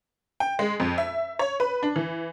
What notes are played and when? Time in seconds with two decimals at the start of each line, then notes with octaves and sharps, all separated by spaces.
0.40 G5
0.59 G#3
0.80 F2
0.98 E5
1.39 C#5
1.60 B4
1.83 D4
1.96 E3